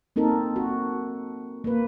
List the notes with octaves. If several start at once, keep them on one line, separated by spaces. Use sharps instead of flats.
A#3 C4 D#4 A4 A#4
F#4
A#3 B4